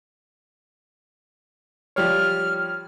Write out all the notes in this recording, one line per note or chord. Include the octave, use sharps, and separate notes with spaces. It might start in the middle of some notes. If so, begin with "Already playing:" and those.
F3 G3 C#5 F6